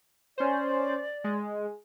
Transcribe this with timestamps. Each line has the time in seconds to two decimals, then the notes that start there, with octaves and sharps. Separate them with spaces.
0.38 C#4 C5 D5
1.24 G#3